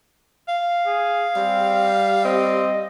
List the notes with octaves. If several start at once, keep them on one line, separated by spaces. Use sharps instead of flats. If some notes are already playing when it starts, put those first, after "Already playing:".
F5
G#4
G3 C4
C4 D#5